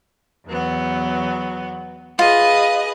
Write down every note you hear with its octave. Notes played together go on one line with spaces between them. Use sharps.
E2 F#3 B3
F4 G#4 B4 D#5